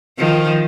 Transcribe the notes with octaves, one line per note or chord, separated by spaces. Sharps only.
D#3 F3